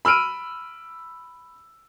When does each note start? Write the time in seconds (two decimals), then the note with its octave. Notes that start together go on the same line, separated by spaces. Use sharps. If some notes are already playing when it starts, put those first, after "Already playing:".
0.05 B5 E6 F6 D7 D#7